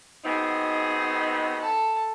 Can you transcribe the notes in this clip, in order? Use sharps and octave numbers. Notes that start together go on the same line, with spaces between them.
B3 C4 D#4 F#4 G#4
A4 A5